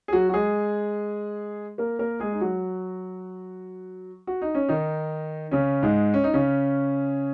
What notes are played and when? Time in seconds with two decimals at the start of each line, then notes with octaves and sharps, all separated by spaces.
0.08 G#4
0.13 F#3 F#4
0.29 F#4
0.33 G#3 G#4
1.78 A#3 A#4
1.99 A#3 A#4
2.20 G#3 G#4
2.32 D#4
2.41 F#3 F#4
4.27 F#4
4.42 D#4
4.55 C#4
4.68 D#3 D#4
5.51 C#3 C#4
5.83 G#2 G#3
6.14 C#4
6.24 D#4
6.34 C#3 C#4